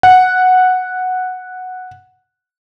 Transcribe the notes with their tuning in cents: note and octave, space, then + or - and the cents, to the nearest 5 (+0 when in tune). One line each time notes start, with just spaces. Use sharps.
F#5 -5